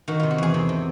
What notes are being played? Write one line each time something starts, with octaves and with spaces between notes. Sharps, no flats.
D#3 F#4
C3 F4
F#4
E2 G#4
C3
C3